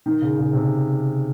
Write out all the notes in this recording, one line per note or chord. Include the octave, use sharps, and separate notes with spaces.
D#3
C#3
C#3
C3